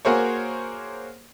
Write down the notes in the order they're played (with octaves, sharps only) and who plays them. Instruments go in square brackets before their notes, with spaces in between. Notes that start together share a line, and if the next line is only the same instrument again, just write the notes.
[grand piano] A#3 F#4 G#4 A#4 C5 C#5